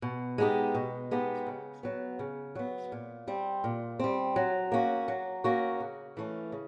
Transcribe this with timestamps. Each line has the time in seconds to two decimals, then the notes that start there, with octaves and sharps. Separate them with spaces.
0.02 B2
0.38 G#3 B3 D#4 G4
0.75 B2
1.11 G#3 B3 D#4 G4
1.47 C#3
1.83 F#3 B3
2.19 C#3
2.55 F#3 B3
2.92 A#2
3.28 G3 C4
3.64 A#2
3.99 G3 C4
4.36 F#3
4.72 A#3 C#4 F#4
5.08 F#3
5.44 A#3 C#4 F#4
5.80 C#3
6.17 E3 A3 C#4
6.52 C#3